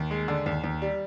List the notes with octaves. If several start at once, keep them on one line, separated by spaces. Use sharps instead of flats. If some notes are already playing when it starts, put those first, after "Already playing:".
Already playing: D#2
G#3
D3
D#2
D#2
G3